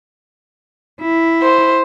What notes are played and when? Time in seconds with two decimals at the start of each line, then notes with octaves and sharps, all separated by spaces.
1.01 E4
1.42 C5